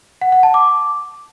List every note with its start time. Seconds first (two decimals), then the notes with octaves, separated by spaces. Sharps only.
0.21 F#5
0.32 F#5
0.43 A5
0.54 D6